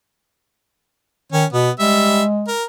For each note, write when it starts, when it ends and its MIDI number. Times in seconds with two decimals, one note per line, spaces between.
1.32 1.45 51
1.32 1.45 61
1.53 1.70 47
1.53 1.71 59
1.80 2.22 55
1.80 2.51 56
1.80 2.22 76
2.48 2.64 70